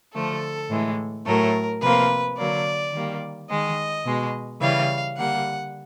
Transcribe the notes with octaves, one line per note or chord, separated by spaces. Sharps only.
D3 F3 A3 A4
A2 E3 G#3
A2 F#3 A3 A#4
C3 F3 A#3 B4
D3 F#3 A#3 D5
D#3 G3 A#3
D#3 G#3 D#5
B2 G#3
C#3 E3 G3 F5
D3 G3 A#3 F#5